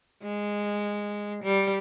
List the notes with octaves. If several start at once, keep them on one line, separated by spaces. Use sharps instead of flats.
G#3
G3